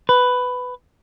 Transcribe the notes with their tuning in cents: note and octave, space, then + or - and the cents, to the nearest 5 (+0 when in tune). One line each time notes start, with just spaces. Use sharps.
B4 +10